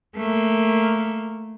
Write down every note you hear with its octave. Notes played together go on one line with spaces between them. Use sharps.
A3 A#3